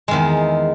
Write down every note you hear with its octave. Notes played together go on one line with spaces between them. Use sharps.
E2 D#3 G#3